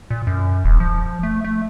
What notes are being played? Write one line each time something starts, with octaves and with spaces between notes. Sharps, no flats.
A#2
F#2
D#1
F3
A3
A3